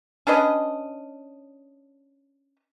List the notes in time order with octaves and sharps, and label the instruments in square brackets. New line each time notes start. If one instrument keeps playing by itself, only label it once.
[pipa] C#4 D4 B4 D#5